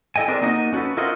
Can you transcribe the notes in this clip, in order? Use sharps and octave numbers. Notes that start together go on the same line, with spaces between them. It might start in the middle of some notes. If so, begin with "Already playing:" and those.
E4 A4 D#5 G5 G#5
C4 D4 G#4 A#4 D5
A#3 D#4 F#4 D#5
C#4 F#4 G#4 A4 B4
E4 F4 A#4 C5 D#5 F#5